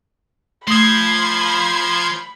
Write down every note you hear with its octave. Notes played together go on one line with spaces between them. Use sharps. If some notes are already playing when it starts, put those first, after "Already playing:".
F3 A3 B5 C6 D#6 G#6